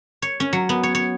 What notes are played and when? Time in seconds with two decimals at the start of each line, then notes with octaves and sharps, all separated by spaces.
0.22 C#5
0.40 C#4
0.53 F#3
0.69 B3
0.83 C#5
0.95 C#5